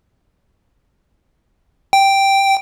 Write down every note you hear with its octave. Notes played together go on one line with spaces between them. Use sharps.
G5